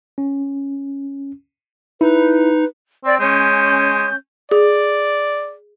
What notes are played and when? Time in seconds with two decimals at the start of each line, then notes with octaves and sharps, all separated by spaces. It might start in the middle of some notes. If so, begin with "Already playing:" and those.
0.18 C#4
2.01 D#4 E4 B4
3.05 C4 D5
3.20 G#3 C#4 G6
4.51 G#4 D5